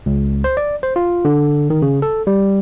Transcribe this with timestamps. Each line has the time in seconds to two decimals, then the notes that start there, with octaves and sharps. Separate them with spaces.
0.06 C#2
0.44 C5
0.57 D5
0.83 C5
0.96 F4
1.25 D3
1.70 D#3
1.82 C#3
2.02 A4
2.27 G3